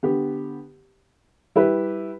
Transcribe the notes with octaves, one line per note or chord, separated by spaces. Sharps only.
D3 B3 G4
G3 E4 G4 B4